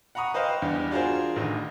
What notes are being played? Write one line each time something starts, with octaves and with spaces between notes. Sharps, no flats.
F#5 A#5 B5 C#6 D#6
B4 C5 D#5 F5 G5
E2 G2
D4 F4 F#4 G#4 A#4 C5
A1 A2 D3 D#3